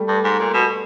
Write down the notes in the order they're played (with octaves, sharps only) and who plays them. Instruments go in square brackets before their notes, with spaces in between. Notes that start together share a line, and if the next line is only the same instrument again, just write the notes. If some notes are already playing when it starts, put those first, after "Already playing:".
Already playing: [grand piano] G3 A3
[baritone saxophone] G2
G#2
A#2
B2